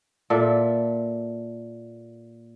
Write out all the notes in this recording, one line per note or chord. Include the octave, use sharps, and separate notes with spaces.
A#2 A4 E5